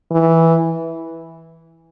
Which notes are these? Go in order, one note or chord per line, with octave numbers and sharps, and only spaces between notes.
E3